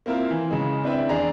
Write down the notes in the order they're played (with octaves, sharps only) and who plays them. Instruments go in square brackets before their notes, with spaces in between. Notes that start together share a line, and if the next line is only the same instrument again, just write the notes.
[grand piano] A#3 C4 E4 F4 A#4
E3
C#3 G#3
C4 D4 E4 B4 E5 G5
E2 D4 G#4 A#5